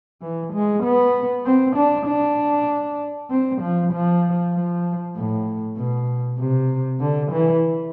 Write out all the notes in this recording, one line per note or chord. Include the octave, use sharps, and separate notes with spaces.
E3
G#3
B3
C4
D4
D4
C4
F3
F3
F3
A2
B2
C3
D3
E3